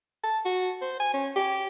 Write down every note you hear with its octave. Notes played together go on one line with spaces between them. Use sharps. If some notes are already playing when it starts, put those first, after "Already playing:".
A5
F#4
C5
G#5
C#4
G4